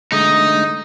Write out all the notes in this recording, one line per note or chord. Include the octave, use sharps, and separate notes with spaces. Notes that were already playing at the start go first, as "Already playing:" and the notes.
D3 G#3 A3 D#4 D#6